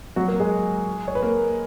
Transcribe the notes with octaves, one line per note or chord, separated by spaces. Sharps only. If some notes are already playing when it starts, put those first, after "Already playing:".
F#3 F#4
A#3 A#4
G#3 G#4
C#5
B4
A#3 A#4